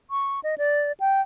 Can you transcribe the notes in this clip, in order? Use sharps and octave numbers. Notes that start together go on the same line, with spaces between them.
C#6
D#5
D5
G5